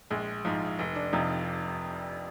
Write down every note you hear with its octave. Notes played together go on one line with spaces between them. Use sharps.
A#1 G#3
G#2 F3
F1
D4
F2 C3 F3 D#4